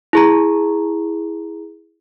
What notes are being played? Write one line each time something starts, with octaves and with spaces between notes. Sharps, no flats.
E4 G#4 A#5